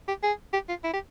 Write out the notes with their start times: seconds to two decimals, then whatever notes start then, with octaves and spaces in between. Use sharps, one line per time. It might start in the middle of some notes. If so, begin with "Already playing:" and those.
0.08 G4
0.23 G#4
0.53 G4
0.69 F4
0.84 E4
0.94 G4